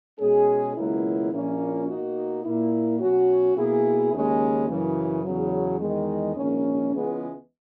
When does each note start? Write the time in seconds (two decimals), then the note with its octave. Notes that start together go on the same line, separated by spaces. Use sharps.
0.19 B2 G#3 C#4 G#4
0.76 C#2 B2 F#3 A#3 E4
1.31 A#1 A#2 A#3 C#4 E4
1.88 B2 A#3 D#4 F#4
2.43 A#2 A#3 E4
3.00 B2 F#3 C#4 F#4
3.56 B2 A#3 E4 G#4
4.12 D#2 C#3 G#3 C#4
4.68 F#2 C#3 E3
5.24 E2 C#3 F#3
5.79 E2 D#3 G#3
6.36 A#1 G#2 D#3 A#3 C#4
6.92 C#2 C#3 E3 G#3 B3